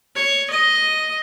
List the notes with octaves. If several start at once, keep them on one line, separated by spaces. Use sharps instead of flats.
C#5
D#5